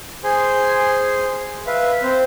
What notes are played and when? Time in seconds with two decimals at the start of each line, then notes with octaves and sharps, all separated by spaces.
0.24 G#4 C5 G#5 C6
1.67 B4 E5 F5
2.03 C4 C5